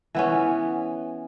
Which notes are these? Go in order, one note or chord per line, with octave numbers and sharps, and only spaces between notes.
E3 B3 C#4